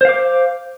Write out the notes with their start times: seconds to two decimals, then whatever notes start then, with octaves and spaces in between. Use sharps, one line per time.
0.01 C5
0.05 F5
0.09 D6